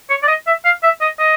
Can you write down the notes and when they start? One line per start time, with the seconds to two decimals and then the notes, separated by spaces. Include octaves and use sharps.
0.10 C#5
0.23 D5
0.28 D#5
0.47 E5
0.65 F5
0.83 E5
1.01 D#5
1.19 D#5